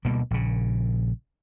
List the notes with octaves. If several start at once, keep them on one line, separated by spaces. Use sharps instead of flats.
D2 B2 G3 A#3
A#1 C#3